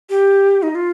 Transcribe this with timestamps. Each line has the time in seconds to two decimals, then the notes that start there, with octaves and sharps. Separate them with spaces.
0.10 G4
0.63 D#4
0.75 F4